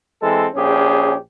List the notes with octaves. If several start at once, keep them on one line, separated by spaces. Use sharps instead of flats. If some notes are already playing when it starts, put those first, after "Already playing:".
E3 G#3 C4 A4
A#1 C#4 G4 G#4